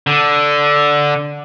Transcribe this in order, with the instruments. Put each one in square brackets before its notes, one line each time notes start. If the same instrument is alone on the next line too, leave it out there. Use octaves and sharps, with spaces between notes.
[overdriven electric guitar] D3